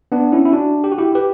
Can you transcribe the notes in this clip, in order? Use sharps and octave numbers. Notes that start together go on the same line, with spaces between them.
B3 D4
C#4 E4
E4
D4 F#4
G4
F#4
E4 G4
G4 B4